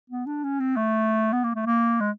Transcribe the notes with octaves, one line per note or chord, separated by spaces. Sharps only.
B3
D4
C#4
C4
A3
B3
A#3
A3
A#3
G#3